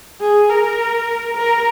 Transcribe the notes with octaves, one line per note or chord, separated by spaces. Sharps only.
G#4
A#4
A#4